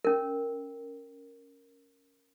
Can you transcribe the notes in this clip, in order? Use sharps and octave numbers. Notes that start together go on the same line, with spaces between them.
C#4 A#4